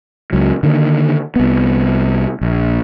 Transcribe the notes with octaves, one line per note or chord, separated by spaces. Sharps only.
C#2 F#3
D3 D#3 A#3
C2 B3
A#1